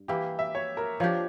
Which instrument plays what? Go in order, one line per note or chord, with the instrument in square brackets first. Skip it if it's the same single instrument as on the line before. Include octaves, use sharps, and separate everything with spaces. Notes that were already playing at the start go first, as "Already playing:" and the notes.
Already playing: [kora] G2
[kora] E3 A#3 E4 [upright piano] G4
[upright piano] E5
C#5
A#4
[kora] F3 A#3 D4 G4 [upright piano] C#5